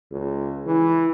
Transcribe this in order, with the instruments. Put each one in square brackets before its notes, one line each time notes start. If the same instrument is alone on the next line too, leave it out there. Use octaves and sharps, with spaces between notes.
[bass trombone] C#2
E3